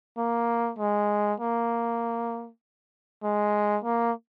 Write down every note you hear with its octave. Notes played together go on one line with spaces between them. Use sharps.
A#3
G#3
A#3
G#3
A#3